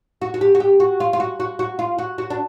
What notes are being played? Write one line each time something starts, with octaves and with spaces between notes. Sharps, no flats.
F#4
F#4
G4
F#4
G4
F#4
F4
F4
F#4
F#4
F#4
F4
F#4
F#4
D4